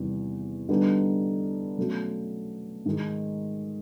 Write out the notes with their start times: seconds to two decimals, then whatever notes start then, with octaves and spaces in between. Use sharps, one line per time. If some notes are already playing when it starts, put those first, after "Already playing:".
Already playing: E2 C3 D#3 G3 B3
0.69 D3 G3 B3 D#4
1.78 B2 F#3 A3 C#4
2.85 G#2 D#3 G#3